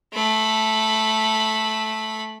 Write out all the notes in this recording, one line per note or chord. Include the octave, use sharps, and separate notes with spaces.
A3 B5